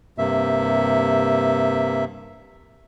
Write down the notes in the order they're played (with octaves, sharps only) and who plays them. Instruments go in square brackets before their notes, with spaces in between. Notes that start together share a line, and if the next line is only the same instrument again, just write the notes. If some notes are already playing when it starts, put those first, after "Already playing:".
[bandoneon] G2 C3 A#3 E5